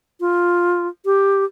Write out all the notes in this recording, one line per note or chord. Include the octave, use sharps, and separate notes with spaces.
F4
G4